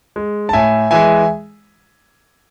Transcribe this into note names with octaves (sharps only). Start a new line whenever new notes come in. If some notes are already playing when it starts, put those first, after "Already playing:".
G#3
A5
A2 E5 G#5
E3 G#3 E5 G#5